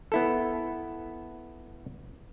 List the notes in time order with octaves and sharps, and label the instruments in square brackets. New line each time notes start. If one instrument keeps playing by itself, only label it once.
[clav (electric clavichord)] B3 E4 A4